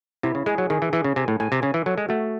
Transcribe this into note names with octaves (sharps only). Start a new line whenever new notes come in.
C3 E4
C#3
G#3 G#4
F#3
D#3 G#4
E3
E3 G#4
C#3
C3 G#5
A2
A2 G#5
C3
C#3 G#5
E3
F#3 A4
G#3
A3 F#4